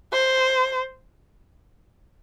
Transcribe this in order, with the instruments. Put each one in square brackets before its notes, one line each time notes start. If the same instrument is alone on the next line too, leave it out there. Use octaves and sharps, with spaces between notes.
[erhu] C5